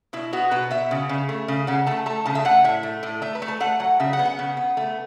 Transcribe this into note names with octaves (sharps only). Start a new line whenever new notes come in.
B2 E4
B3 F#4
B2 B4
B3 E5
C#3
C#3
A3
C#3
C#3 F#5
A3 A5
A3 A5
C#3 A5
E5
A3 F#5
A2 E5
A3
A2
A3 E5
B4
A3
A5
A3 F#5
F#3 F#5
C#3 E5
F#5
B3
F#5
C#3
B3
A3